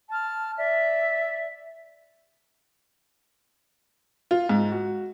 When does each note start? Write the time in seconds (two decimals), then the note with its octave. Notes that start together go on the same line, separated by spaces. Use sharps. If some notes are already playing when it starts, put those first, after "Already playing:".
0.10 A5 F6
0.57 D5 E5
4.31 F4
4.49 G#2
4.72 F#4